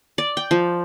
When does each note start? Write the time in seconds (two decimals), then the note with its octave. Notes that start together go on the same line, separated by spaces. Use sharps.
0.18 D5
0.37 G5
0.51 F3